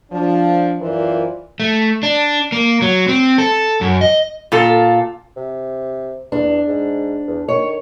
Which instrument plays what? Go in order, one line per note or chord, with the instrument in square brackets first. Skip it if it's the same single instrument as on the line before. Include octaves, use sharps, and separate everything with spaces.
[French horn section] F3 D4
F#2 E3 F4 A#4 C5 D5
[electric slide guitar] A3
D4
A#3
F#3
C4
A4
F#2
D#5
[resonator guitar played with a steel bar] A#2 F4 A4
[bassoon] C3
[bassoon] E2 [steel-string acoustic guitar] D4
[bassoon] G#2
E2
[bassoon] D#3 [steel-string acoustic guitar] C#5